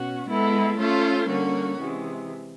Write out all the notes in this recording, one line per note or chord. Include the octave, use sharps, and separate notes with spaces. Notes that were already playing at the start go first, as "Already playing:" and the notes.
Already playing: B2 C#4 F#4
G#3 B3 E4 A4
A3 C#4 F4 A4 C5
D3 G3 A#3 C#4 F#4
C3 E3 G#3